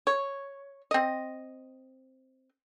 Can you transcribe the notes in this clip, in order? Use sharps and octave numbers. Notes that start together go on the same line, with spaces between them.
C#5
C4 D#5